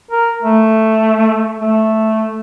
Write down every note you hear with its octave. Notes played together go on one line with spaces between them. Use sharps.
A#4
A3
A3